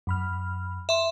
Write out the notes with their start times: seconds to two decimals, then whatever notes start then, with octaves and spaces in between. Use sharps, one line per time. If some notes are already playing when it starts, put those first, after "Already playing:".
0.07 F#2 B5 F6
0.89 E5 C6